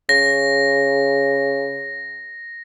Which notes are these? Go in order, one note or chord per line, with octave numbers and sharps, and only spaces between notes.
C#3 A#6